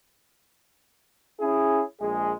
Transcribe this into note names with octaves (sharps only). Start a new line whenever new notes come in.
C#4 E4 G#4
A#1 G#3 G#4